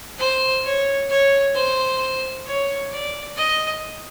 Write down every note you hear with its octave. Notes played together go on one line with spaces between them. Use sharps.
C5
C#5
C#5
C5
C#5
D5
D#5